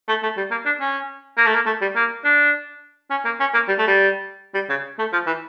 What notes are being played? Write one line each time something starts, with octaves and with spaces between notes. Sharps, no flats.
A3
A3
G3
A#3
D4
C#4
A#3
A3
A#3
A3
G3
A#3
D4
C#4
A#3
C#4
A#3
G3
A3
G3
G3
C#3
A3
F3
E3